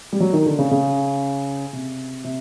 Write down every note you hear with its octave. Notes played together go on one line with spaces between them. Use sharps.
G3
F#3
D#3
D3
C#3
C#3
C3
C3